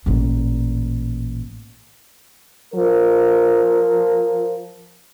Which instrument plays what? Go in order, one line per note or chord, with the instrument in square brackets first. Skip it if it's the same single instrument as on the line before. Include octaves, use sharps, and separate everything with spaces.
[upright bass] A1 A#2
[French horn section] F3 A#4